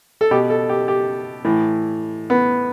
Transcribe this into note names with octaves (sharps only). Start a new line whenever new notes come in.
A4
B2 G4
A4
G4
G4
A2 E3
B3